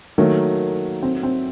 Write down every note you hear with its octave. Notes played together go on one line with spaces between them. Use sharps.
D#3 F#3 A3 A#3
C4
C4